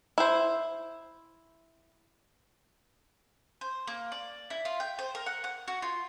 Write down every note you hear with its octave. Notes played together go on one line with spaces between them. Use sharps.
E4 C5
C5
A#3
D5
E4
F4
G5
C5
A#4
F#5
F#5
F#4
F4